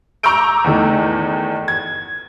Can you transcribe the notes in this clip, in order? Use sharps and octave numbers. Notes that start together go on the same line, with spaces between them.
A#5 C#6 D6 E6 G6 D7
E2 D#3 A3
G#6